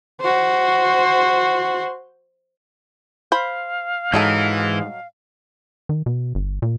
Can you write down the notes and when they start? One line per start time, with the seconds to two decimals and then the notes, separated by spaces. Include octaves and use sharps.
0.21 F#4 C5
3.32 C5 F5 B5
4.13 G#2 E3 F#3 D#4 A4
5.89 D#3
6.06 B2
6.35 G1
6.62 A#2